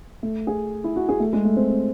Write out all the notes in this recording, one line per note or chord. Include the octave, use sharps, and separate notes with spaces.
A3
G#4
E4
F#4
G#4
A3
G#3
A3
C4
C4